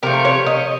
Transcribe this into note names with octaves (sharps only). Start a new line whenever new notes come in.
C3 F3 A3 A#4
C#5
D#5